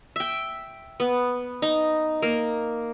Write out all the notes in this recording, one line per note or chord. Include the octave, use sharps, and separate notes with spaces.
E5 G5
B3
D#4
A#3